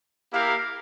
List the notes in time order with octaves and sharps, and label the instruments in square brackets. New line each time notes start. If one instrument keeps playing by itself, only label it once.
[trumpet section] A#3 E4 G4 A#4 F5